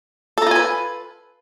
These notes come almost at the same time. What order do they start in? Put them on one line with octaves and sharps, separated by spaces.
A4 A#5 F4 G#5 B4